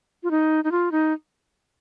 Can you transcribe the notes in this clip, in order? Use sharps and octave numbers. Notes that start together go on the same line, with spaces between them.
F4
D#4
D#4
F4
D#4